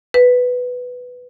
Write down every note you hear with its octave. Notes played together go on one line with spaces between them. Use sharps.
B4